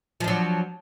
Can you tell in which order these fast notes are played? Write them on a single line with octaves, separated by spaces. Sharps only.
F3 D4 F#3